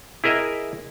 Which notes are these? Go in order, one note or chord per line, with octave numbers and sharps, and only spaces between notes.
E4 G#4 A#4 D#5 E5